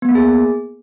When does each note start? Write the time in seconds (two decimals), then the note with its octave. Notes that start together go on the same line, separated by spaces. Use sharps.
0.02 B3
0.09 A#3
0.15 G#4